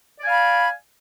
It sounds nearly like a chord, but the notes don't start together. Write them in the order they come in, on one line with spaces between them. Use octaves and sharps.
D5 G#5 F5 B5